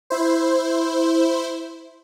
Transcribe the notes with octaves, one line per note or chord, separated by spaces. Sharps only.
E4 C5